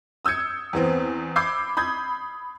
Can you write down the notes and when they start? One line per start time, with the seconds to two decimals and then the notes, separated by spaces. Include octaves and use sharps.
0.25 D#6 E6 G6 G#6 C#7
0.73 E2 B3 C4
1.36 B5 D6 E6 G6 G#6 C7
1.77 B5 D#6 G6 G#6